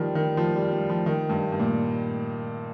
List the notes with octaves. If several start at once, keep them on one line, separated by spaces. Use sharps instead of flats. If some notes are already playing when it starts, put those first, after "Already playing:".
Already playing: D#3 F3 G3
D#3
F3
G3
G3
F3
D#3
G2
G2
A#2